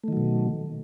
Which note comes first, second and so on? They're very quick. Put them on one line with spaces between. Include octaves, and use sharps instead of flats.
A3 D#3 F#3 B2